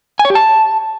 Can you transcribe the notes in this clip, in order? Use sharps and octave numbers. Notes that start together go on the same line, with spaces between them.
G#5
C#5
G4
A5